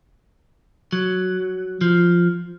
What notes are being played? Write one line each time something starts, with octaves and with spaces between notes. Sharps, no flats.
F#3
F3